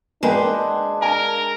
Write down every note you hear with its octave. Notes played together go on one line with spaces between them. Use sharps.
G#3 A#3 D4 B4 G5
A#4 G#5